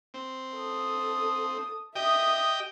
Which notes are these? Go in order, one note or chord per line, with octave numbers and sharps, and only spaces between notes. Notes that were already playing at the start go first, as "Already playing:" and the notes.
C4
A4 D#6
G4 D#5 E5 G5 D#6